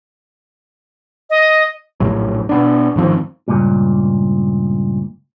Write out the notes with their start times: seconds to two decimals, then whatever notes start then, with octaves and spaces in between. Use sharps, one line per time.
1.30 D#5
2.00 A#1 A2 C3 F#3
2.49 B2 B3 D4
2.96 G#2 D#3 F3 C4
3.48 C#2 G2 A#2